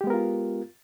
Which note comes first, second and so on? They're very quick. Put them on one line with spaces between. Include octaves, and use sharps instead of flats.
G4 G#3 B3 A#4 F4